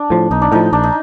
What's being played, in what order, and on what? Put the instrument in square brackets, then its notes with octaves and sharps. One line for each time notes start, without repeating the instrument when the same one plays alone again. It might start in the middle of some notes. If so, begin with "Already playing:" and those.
Already playing: [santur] D4
[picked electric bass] A2 F3
[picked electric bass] B1 [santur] D#4
[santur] D4
[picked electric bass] A2 F3 [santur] D#4
[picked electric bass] A#1 [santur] D4
[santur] D#4